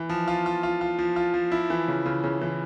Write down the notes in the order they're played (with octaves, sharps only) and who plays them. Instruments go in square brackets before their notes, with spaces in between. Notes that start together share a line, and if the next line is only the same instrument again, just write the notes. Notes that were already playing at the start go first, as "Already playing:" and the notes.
Already playing: [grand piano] E3
F3
F4
F4
F4
F4
F3
F4
F3
E4
E3
C#3
C#3
C#3
E3